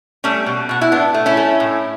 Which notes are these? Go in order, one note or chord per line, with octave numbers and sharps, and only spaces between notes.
G3 A3 C#4
B2
B2 F#4
E4
A2 B3 D4
A3
C#4 E4
A3
A2